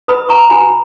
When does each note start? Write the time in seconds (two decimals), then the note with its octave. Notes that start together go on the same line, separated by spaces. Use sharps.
0.08 B4 B5 D#6
0.29 A#5 C#6
0.50 F#4 G#5 B5